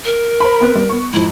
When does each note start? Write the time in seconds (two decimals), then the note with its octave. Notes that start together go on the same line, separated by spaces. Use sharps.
0.05 A#4
0.40 C5 A#5 B5
0.60 B3 C4 B4
0.75 G3
0.89 B3 C#6
1.14 F2 G#2 E4